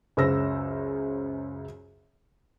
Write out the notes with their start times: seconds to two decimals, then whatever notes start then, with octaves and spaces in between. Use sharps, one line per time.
0.17 C#2 F#2 C#3 C5 E6 A#6